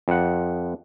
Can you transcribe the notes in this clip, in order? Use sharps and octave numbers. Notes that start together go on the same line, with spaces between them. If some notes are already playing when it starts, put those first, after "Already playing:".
F2 F#5